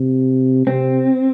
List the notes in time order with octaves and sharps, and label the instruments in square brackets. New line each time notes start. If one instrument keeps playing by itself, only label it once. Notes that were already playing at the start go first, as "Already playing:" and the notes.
Already playing: [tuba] C3
[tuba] C3 [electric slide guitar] C4